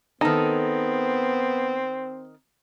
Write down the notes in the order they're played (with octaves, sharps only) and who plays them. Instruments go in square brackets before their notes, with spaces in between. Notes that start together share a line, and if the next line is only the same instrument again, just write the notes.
[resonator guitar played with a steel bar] D#3 D#4 [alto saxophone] B3 [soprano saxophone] C4 [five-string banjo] A4